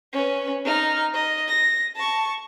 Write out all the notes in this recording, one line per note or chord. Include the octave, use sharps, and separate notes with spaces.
C#4 B4
D#4 F6
D#5
A#6
A5 C#6